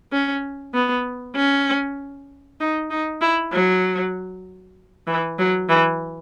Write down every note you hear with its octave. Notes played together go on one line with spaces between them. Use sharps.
C#4
B3
C#4
D#4
D#4
E4
F#3
E3
F#3
E3